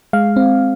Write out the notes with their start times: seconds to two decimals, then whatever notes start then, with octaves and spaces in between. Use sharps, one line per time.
0.13 G#3 F5
0.36 C4